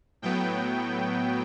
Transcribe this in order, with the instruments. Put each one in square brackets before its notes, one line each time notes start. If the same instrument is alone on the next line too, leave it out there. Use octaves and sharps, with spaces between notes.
[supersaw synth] A2 F#3 B3 G5